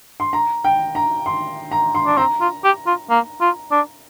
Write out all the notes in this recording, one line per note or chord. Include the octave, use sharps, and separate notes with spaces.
C6
A#5
G5
A#5
C6
A#5
C6
D4
C4 A#5
F4
G4
F4
A#3
F4
D4